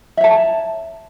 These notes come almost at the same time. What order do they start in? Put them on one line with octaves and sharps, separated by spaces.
E5 C#5 A5